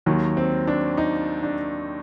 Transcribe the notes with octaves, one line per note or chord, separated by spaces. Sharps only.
D#2 D#3 F#3
C4
D4
D#4
D4